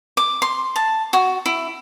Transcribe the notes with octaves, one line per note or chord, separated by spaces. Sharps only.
D6
C6
A5
F#4
E4